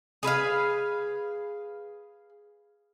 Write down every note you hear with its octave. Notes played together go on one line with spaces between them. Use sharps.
G#4 B4 E5 F5